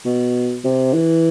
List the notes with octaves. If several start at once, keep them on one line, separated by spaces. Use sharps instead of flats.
B2
C3
E3